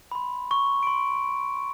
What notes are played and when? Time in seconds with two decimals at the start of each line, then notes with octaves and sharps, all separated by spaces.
0.12 B5 C6
0.51 C#6
0.83 C6 D7